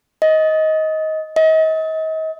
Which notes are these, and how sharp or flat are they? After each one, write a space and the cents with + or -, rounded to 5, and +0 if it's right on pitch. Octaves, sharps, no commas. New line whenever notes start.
D#5 +15
D#5 +35